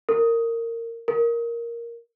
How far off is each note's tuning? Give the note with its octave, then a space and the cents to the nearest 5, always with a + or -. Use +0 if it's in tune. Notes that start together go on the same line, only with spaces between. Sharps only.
A#4 -20
A#4 +5